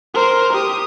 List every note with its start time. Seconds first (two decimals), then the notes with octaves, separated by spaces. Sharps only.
0.14 A#4 C5
0.53 G4 D#6